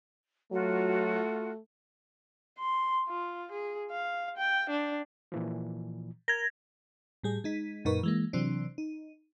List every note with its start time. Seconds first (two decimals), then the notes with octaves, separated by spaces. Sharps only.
0.52 F#3 A3 F4 F#4
2.59 C6
3.09 F4
3.52 G#4
3.91 F5
4.38 G5
4.70 D4
5.32 A#2 E3 F3
6.28 A#4 G#6 A#6
7.23 A2 G3 G#4
7.44 G#3 D#4 B6
7.85 F#2 A#2 D#4 A#4 B4 C#6
8.03 E3 G#3 A#3
8.33 C3 E3 F#3 C4 D4
8.78 D#4